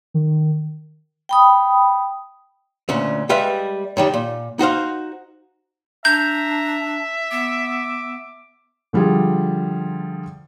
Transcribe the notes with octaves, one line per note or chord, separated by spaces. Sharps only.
D#3
G5 B5 D#6
D2 A#2 C#4
G3 G#3 B4 E5 F5
F#2 D#3 G3
A#2
D#4 F#4 C5 F5
D4 E5 A#5 G6
B3 D6
D3 F3 G3 F4 G#4